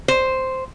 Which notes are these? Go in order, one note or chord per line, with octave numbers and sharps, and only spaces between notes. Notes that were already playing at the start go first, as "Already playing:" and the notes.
C5